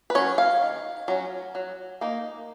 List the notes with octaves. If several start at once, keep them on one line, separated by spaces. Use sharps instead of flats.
B4
F#3 C#4 C#5
F5
D#3
F#3 C#4
F#3
A#3 D#4